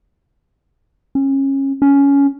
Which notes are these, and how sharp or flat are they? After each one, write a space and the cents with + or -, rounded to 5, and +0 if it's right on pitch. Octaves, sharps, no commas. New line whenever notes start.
C#4 -25
C#4 +15